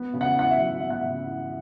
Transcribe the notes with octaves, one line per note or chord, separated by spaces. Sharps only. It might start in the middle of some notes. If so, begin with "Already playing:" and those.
Already playing: B3
C#3
F#5
E4 F#5
E5
F#3
B3 E5
F#5
C#3 E5
E4